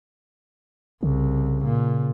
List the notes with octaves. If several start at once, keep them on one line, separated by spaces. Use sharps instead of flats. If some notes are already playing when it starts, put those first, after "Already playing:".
C2 C#3
A#2